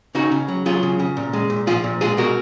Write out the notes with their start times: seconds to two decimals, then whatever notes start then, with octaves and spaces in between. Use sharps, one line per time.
0.15 C#3 D#4 F#4
0.32 C#3
0.48 F#3
0.66 F#3 F4 G#4
0.83 C#3
0.99 C#3
1.17 A#2
1.33 G#3
1.50 A#2
1.67 F3 F4 G#4
1.84 A#2
2.01 G#3 F4 G#4
2.17 B2 F#4 A#4